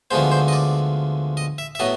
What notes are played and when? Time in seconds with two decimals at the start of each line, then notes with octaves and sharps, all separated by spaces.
0.11 D2 D3 F3 G#3 B3 C5
0.31 C5
0.48 D#5
0.53 D5
1.37 D#5
1.58 E5
1.75 E5
1.79 A2 F#3 B3 D#5